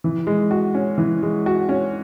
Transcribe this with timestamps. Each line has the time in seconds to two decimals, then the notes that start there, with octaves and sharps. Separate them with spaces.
0.04 E3
0.27 G#3
0.51 F#4
0.74 C#4
0.98 E3
1.23 G#3
1.46 F#4
1.69 C#4